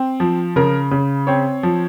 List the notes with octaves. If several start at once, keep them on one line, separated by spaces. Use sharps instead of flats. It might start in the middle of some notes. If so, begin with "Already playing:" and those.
Already playing: C4
F3
C#3 A#4
C#3
C4 C#5
F3